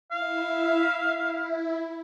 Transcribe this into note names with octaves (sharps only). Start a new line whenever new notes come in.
E4 E5 F5
E4